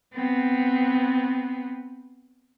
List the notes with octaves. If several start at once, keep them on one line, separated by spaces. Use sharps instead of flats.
B3 C4